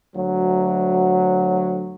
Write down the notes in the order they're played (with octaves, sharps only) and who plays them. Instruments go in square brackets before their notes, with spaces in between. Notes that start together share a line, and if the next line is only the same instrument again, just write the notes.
[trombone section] D2 F#3